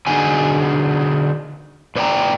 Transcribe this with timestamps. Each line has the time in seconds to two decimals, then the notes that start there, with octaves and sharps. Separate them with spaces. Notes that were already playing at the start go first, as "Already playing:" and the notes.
0.07 D3 D#4 F#4 G#4 G#5
1.96 A2 B4 D5 E5 G5 A#5